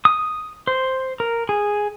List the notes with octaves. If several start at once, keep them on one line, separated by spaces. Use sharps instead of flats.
D#6
C5
A#4
G#4